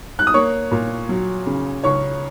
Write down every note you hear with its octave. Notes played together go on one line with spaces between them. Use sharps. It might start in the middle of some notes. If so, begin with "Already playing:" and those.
F#6
D#6
A#3 C#5 C#6
A#2
F#3
C#3
C#2 C#5 C#6